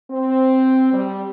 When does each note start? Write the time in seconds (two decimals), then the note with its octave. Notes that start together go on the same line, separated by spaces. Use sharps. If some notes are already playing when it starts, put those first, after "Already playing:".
0.11 C4
0.93 G3